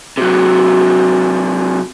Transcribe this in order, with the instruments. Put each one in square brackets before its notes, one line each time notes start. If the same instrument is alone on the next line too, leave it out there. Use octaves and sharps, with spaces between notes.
[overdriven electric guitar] C3 F#3 [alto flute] F#4